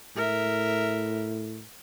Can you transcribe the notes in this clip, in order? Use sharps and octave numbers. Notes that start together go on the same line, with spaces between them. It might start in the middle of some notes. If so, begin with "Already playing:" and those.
A2 A#4 E5